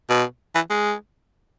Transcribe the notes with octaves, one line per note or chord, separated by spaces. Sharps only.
B2
E3
G#3